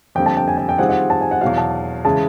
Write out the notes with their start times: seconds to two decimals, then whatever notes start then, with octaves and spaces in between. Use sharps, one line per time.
0.15 F2 D3 G3 A#3 G5
0.26 A5
0.37 G5
0.48 G#5
0.58 G#5
0.69 G5
0.78 D#3 G3 C4 F4 G#4 F#5
0.89 F#5
1.10 A5
1.21 G#5
1.31 F#5
1.41 E2 B2 F#3 F5
1.58 A5
2.05 C#3 E3 G#3 A5